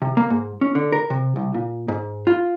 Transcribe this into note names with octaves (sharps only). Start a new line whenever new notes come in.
C3
A#3
G#2
C#4
D3
A#4
C3
C2
A#2
G#2
F4